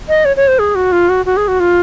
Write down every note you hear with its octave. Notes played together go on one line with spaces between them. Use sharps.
D#5
C#5
C#5
C5
G#4
F#4
F4
F#4
F#4
G#4
F#4
F4